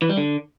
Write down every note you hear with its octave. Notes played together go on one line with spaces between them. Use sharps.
E3
G3
D3